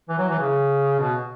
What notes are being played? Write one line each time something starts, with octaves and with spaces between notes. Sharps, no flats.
E3
F#3
E3
C#3
B2